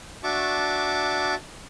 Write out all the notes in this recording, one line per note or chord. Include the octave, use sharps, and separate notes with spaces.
D4 F#4 E5 A5 C#6 D6